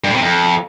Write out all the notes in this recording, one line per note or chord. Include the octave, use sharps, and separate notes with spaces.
G2
A2
C3
F2